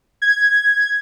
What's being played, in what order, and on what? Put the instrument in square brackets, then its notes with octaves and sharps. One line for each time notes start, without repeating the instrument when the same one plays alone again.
[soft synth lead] G#6